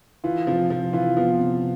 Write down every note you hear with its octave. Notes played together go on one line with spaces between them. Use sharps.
E3 F4
C3 F3
F3 F4
E3 F4
F3 B3
C3